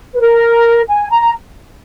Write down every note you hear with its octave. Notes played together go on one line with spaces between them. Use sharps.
B4
A#4
G#5
A#5